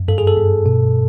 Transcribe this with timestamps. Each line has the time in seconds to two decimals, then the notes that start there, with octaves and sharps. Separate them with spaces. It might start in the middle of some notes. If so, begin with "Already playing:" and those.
Already playing: F#2
0.08 G2 A4
0.18 G#4
0.27 A4
0.37 G2
0.66 B2